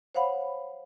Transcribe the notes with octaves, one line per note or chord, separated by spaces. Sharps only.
C5 C#5 F5 F#5 B5